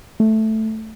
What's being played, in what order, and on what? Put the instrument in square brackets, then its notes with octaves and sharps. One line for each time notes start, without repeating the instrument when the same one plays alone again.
[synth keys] A3